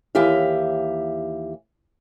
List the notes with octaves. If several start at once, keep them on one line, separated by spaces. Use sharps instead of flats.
D#2 E3 G4 E5 F5